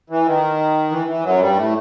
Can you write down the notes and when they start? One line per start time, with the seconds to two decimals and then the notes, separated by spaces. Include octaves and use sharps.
0.10 E3
0.26 D#3
0.91 E3
1.07 E3
1.23 F#2 F#3
1.41 G2 G3
1.56 A2 A3